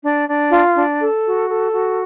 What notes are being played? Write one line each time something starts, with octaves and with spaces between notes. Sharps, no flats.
D4
D4
F4
D4
A4
F#4
A4
F#4